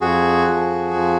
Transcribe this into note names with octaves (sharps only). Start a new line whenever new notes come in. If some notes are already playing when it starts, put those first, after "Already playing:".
F2 F#4 G#4
F3
F2